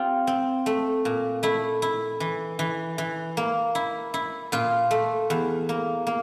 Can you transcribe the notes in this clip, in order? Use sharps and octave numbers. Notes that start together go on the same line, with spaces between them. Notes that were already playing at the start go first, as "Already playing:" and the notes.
Already playing: C4 F4 G4
C4
A3
A#2
A3 E4
E4
E3
E3
E3
A#3
E4
E4
A#2 F4
A3
E2
A#3
A#3